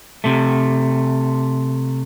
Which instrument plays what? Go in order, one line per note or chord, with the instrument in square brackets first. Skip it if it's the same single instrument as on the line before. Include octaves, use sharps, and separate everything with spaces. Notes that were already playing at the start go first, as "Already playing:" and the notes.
[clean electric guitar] C3 A3